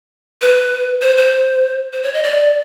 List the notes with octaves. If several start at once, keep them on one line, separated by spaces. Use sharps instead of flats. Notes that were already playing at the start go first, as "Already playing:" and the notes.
B4
C5
C5
C5
C#5
D#5
D5